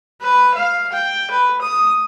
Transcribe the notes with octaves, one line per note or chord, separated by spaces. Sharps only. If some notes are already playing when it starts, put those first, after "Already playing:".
B4
F5
G5
B4
D#6